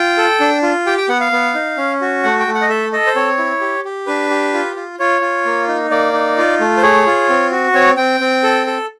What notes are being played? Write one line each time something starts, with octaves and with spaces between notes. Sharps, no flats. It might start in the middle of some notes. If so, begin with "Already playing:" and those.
Already playing: F4 G5
A4
D4
F4
G4 G5
G5
B3 F#5
F5
B3
D#4
C#4
F#4
A3 F#5
G5
A3
F#5
D#5
A4 E5
A4 D#5
C5
C4 C#5
E4
G4
G4
D4 B4
G4
F4
F4
F4 C#5
F4
A#3
D#4
A#3 D5
D#4
F4
A3
C5
G#4 C#5
F4
C4
F#4
C4 C#5
C4 G5
C4
A4
A4